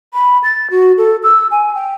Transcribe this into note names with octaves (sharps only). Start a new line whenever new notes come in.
B5
A6
F#4
A4
E6
G#5
G5